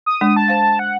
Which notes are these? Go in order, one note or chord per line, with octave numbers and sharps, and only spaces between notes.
D#6
G#3 D4
A5
C5 F5
F#5